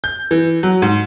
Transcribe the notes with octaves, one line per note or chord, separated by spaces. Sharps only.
G6
E3
F#3
G#2